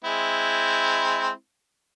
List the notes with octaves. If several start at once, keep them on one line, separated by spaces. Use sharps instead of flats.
G#3 C4 E4